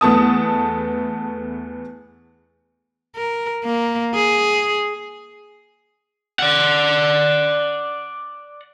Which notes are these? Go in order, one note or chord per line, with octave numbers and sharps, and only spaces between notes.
E2 A3 B3 A5 D#6
A#4
A#3
G#4
D5 F#5